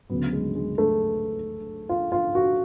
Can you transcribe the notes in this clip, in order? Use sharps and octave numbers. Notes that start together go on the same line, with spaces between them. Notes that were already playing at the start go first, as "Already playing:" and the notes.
D2 C#3 F#3 B3
G#3
G#3
A3
F4
F4
F#4